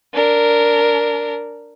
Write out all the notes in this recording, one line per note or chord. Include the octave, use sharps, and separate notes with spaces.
D4 A#4